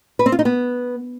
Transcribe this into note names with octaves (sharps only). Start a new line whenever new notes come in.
B4
C4
F4
D#4
B3